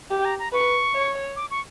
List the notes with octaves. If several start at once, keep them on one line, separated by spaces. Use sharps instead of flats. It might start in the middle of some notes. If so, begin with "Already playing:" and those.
G4
G5
A#5
A#5
B4 C#6
C#5
D6
C#6